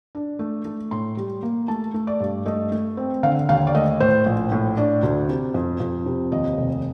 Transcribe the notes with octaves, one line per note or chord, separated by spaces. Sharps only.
D4
A3
A3
A2 C6
G3
A#3
A3 A5
A3
D5
G2
A3 D#5
A3
C4
D3 F5
D#2 F5
D5
A3 D#5
A2 C5
A#1
A2
D4 D5
D2
C3
F2
F2
C3
D#2 D#5
F1